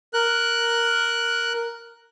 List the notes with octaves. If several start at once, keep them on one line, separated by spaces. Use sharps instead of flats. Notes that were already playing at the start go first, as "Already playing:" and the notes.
A#4 F#6